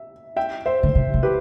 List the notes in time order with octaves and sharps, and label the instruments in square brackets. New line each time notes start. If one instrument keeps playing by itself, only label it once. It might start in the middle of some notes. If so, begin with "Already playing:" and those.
Already playing: [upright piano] E5
E5 G5
C5 E5
[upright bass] D3
C3
C3
[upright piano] G4 B4